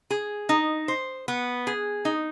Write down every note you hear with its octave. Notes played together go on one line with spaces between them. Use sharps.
G#4
D#4
C5
B3
G#4
D#4